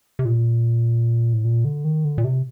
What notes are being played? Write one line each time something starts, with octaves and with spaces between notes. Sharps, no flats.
C3
A#2
A2
A#2
D3
D#3
D3
A#2
C3